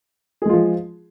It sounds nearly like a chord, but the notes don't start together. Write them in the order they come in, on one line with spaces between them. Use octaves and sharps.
G#4 G#3 F4 F3